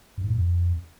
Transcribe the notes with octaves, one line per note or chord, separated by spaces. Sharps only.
G2
G#2
A2
F2